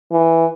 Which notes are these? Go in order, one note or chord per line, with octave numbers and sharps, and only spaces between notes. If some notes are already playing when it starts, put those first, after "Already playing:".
E3